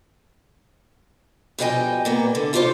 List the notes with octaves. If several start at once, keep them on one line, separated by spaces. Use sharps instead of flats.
B2 F3 G3 D#5 G5 G#5
A#2 A#3 B3
D3
E4 F4 G4 A#4 C5 C#5